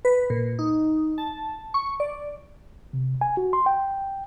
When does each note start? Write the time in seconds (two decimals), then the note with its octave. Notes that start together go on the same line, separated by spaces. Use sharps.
0.05 B4
0.30 A#2
0.59 D#4
1.18 A5
1.74 C#6
2.00 D5
2.93 C3
3.21 G#5
3.37 F#4
3.53 C6
3.66 G5